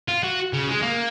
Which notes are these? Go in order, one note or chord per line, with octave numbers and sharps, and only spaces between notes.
F4
F#4
C#3
G#3
A#3